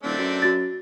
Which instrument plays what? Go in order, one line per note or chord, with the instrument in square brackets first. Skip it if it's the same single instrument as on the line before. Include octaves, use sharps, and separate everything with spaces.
[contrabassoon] D#1 [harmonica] A3 C4 D4
[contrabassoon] F#2
[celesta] F#4 A6